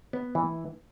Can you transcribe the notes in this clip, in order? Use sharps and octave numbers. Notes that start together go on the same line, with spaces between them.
B3
E3